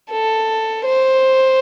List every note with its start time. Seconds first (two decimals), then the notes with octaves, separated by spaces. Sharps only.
0.11 A4
0.85 C5